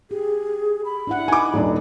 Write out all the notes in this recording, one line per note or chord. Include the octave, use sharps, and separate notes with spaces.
G4 G#4
B5
D4 E4 F#5
D#4 G#5 D6
D#1 D4 D#4 D#5